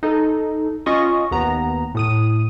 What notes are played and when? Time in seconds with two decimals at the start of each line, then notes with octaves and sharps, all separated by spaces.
0.03 D#4 A4
0.86 C#4 F4 D#5 C#6 D#6
1.31 D#2 B3 A#5
1.95 A2 D#6 D#7